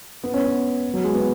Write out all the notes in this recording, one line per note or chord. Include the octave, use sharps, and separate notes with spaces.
B3
C#4
B3
F#3
G#3
B3